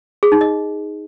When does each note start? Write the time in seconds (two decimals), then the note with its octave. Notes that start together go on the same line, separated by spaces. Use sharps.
0.23 G#4
0.32 D#4
0.41 D#5